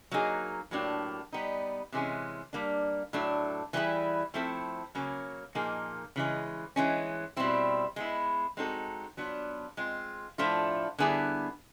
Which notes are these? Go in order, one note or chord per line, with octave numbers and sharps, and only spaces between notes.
F#3 A#3 D#4 G#4
A2 F#3 A#3 D4 G4
G3 B3 D#4
C3 E3 G#3 C#4
G3 A#3 D4
A2 F#3 A3 D4
E3 G3 B3 E4 G#4
F3 A3 C4 E4 A4
C#3 F#3 A#3 C#4
A#2 F3 A#3 D#4 G#4
C#3 E3 G#3
E3 G#3 C#4
B2 G3 C4 E4
G#3 B3 E4
G#3 C4 D#4 F#4 A4
F#3 B3 D4 F4
G#3 C4 F4
A2 F3 A3 D4 F4
D3 G3 B3 E4 G#4